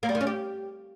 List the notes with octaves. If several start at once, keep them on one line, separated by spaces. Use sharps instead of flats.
A#3
G3
D#3
C#4
G4